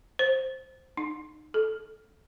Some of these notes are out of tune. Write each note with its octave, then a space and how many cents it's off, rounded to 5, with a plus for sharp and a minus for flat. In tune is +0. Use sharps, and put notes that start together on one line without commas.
C5 +0
D#4 -25
A4 -5